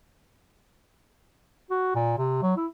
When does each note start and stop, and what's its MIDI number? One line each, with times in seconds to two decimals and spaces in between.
1.70 1.93 66
1.95 2.18 46
2.18 2.37 48
2.42 2.54 54
2.57 2.66 64